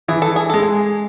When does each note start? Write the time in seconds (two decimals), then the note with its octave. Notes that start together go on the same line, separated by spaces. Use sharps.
0.08 E3 G#4
0.22 A4
0.36 G#4
0.50 G#3 A4
0.63 G#4